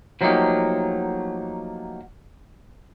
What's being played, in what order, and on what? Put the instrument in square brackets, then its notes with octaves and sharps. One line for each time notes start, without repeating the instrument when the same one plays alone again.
[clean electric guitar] F3 F#3 A3 A#3 D#4 G4